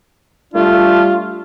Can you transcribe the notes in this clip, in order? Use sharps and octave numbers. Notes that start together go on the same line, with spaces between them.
G3 A3 D4 F4